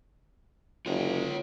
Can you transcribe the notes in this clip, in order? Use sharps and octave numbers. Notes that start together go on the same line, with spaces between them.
F#1 F4 C#5